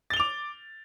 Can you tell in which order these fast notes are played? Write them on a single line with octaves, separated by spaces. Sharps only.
A6 G7 F7 D6